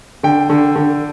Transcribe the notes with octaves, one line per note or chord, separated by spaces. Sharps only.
D3 G5
D3
D3